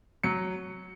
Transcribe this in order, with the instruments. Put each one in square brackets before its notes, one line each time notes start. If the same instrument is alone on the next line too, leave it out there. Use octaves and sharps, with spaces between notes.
[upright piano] F#3 C#7